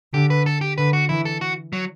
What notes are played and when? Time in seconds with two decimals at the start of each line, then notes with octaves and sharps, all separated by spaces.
0.14 D3 G4
0.30 B4
0.46 A4
0.61 G4
0.78 D3 B4
0.93 F#4
1.09 E3 E4
1.25 A4
1.41 F#4
1.73 F#3